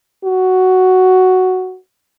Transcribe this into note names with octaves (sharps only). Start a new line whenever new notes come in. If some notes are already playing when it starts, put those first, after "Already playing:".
F#4